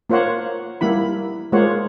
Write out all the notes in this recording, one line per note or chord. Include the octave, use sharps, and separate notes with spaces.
A#3 F4 C5 C#5 F#5
G3 A#3 E4 B5
G#3 A#3 F4 C5 C#5 F#5